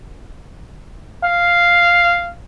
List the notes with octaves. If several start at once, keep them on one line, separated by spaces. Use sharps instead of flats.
F5